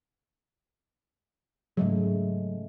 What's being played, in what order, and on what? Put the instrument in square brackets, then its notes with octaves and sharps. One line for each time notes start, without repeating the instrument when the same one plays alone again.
[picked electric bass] G#2 F#3 [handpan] C#3 G#3 A3